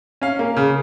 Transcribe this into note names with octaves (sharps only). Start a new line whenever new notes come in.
C#4 F5
A#3
C#3